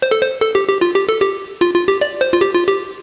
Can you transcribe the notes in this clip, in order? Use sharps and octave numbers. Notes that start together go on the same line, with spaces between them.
C5
A4
C5
A4
G4
G4
F4
G4
A4
G4
F4
F4
G4
D5
C5
F4
G4
F4
G4